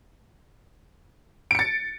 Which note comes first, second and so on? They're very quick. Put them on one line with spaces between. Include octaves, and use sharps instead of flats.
D7 C#7 A6